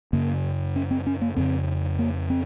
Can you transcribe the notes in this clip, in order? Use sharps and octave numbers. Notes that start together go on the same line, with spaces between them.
F#2 C#3 A#3
C#4
C4
C#4
A#3
F2 C#3 C4
A#3
C4